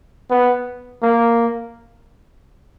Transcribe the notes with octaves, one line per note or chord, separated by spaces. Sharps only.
B3
A#3